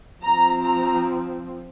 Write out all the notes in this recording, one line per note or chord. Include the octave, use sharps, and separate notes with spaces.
F3 C4 A#5
A#5